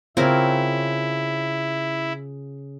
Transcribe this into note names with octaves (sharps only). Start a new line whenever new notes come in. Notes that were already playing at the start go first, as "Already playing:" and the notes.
C#3 C4 E4 F4 A#4 C#5